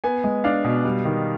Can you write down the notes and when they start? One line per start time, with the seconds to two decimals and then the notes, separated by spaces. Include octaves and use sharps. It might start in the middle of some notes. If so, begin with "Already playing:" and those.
0.04 B3 G#5
0.24 G#3
0.44 D4 F5
0.64 B2
0.85 G3
1.05 D#3